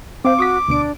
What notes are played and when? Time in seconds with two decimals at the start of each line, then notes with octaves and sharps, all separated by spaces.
0.25 C4 C5 F5 D6
0.39 F#4 C#6 D#6 B6
0.68 D2 B2 D4 D7